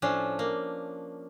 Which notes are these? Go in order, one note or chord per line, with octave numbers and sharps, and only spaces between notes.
A2 F3 C#4 D4
A#3